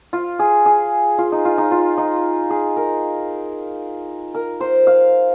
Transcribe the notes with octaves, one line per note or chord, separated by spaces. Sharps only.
F4
G#4
G#4
F4
D#4
F4
D#4
F4
D#4
G#4
A#4
A#4
C5
F5